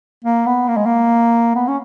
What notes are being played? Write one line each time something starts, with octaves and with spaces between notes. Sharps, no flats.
A#3
B3
A#3
G#3
A#3
B3
C#4